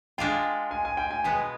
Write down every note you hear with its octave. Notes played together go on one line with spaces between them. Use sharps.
G#3 D4 F4 G5
G#5
G#5
G5
G#5
B2 G#3 B3 G#5